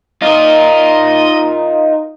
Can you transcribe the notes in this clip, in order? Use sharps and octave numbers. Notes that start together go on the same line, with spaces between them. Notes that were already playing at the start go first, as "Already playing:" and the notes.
D#4 F4 A#4 D#5